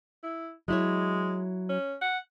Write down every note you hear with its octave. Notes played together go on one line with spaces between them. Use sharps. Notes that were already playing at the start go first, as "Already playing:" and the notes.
E4
F#3 G#3 E4 C#5
C#4
F#5